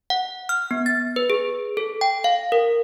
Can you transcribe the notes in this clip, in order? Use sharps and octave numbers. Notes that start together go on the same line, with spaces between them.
F#5
F6
B3
A6
B4
G#4
A4
G5
F5
A#4